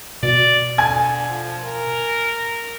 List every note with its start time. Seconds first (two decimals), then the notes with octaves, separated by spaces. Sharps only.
0.23 B2 D5
0.78 D3 G#5 G#6
1.30 F3
1.63 A#4